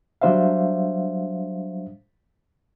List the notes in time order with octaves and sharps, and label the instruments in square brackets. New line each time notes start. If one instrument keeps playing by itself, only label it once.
[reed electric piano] F#3 G3 D4 C5 E5 F5